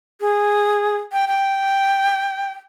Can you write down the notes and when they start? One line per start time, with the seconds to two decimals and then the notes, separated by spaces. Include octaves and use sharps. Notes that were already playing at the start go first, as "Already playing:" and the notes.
0.21 G#4
1.12 G5
1.28 G5